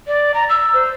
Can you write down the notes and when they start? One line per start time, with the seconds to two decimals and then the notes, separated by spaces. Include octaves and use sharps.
0.07 D5
0.34 A#5
0.49 E6
0.74 C5